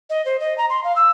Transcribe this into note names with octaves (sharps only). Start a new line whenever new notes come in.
D#5
C5
D#5
A#5
C6
F5
E6